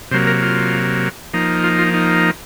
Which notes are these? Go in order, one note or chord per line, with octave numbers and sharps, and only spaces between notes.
C3 F#3 A#3 C5
A#4
F4
F3 A#3 D#4
F4
F4
D#4